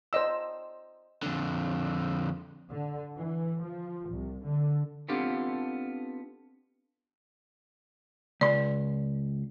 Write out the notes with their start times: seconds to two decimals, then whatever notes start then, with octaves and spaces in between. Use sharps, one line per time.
0.13 C5 D5 D#5 E6
1.23 F2 D3
2.71 D3
3.16 E3
3.62 F3
4.09 C2
4.45 D3
5.09 B3 C4 D4 F4 G4 A4
8.41 C#2 D5 C6